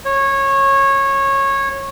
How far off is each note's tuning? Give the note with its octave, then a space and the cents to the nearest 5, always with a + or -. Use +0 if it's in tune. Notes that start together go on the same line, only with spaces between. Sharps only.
C#5 -20